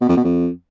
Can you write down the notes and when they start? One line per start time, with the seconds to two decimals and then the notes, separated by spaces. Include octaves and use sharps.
0.01 B2
0.09 F2
0.17 B2
0.25 F2